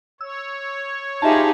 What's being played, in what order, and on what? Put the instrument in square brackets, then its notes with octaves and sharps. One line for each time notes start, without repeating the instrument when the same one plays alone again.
[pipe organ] C#5 [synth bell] E6
[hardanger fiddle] D#4 G#4 [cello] F4 G4 [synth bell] E5 A5